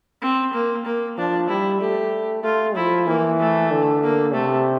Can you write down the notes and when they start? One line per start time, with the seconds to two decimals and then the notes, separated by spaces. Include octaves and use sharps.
0.22 C4
0.53 A#3
0.86 A#3
1.18 F3 D4
1.49 G3 E4
1.81 A3 G4
2.44 A3 F4
2.76 F3 E4
3.07 E3 A#3
3.39 A3
3.71 D3
4.03 A#3
4.34 C3 A3